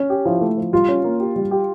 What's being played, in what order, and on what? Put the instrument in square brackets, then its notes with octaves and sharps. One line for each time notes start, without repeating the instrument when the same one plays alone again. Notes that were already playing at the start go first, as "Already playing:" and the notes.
Already playing: [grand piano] C#4
G4
[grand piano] F3 [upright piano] E4
[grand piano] A3
F3
[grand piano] G3 [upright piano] F4
[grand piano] C#4
A#3
G4
G3
G4